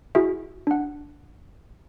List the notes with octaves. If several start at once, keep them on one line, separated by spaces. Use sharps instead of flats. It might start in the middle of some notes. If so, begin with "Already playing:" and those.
E4 F#4 G#4 E5
D4 F#5